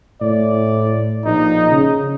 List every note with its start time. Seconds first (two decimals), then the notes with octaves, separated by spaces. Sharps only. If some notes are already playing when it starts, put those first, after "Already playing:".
0.21 A2 D5
1.25 A#1 D#4
1.71 C#3